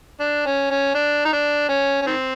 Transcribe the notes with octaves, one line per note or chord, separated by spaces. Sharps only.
D4
C#4
C#4
D4
D#4
D4
C#4
C#4
D#3 C4